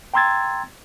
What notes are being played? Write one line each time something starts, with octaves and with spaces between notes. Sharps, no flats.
G5 A#5 C6 E6 G#6 A6